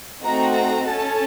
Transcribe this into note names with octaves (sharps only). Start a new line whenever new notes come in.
A3 C4 D#4 F#4 A4 A#5
A#5
C#4 A4 A5